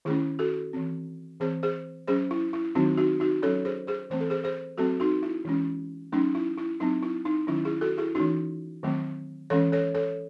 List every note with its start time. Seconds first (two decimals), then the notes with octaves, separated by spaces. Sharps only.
0.05 D#3 A3 C#4 E4 G#4
0.39 F#4 A4
0.73 E3 C4
1.40 E3 C4 G#4 C5
1.63 G#4 C5
2.08 F#3 C#4 G#4 C5
2.31 E4
2.53 E4
2.75 D#3 F#3 C4 D#4 F#4
2.97 D#4 F#4
3.20 D#4 F#4
3.42 F#3 C#4 A4 C#5
3.65 G#4 C5
3.87 G#4 C5
4.10 E3 A3 C4 C5
4.20 A4
4.30 G#4 C5
4.44 G#4 C5
4.78 F#3 A3 C4 F#4 A4
5.00 D#4 F#4
5.23 E4
5.45 E3 G#3 C#4
6.12 F#3 A3 C#4 D#4
6.35 E4
6.58 E4
6.80 F#3 C4 D#4
7.03 E4
7.25 D#4
7.47 D#3 F#3 C#4 E4
7.65 E4 G#4
7.81 F#4 A4
7.98 E4 G#4
8.15 E3 A3 C#4 D#4 F#4
8.83 D#3 F#3 A3 C4
9.50 E3 G#3 C#4 A4 C#5
9.72 A4 C#5
9.95 A4 C#5